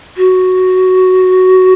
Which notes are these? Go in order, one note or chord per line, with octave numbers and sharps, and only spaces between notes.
F#4